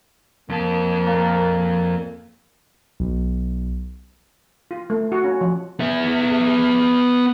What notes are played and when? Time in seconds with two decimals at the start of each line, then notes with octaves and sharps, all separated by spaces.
0.49 F2 A#3 A5
1.06 A#2
3.00 B1
4.71 F4
4.90 A3
5.12 F#4
5.24 C#4
5.41 F3
5.80 B3 E5